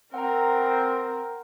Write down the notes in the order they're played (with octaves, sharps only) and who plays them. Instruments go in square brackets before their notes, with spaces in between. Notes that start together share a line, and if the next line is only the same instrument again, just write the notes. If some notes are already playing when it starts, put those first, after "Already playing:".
[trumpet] C4 [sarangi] A#4 [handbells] F#5 G5 A#5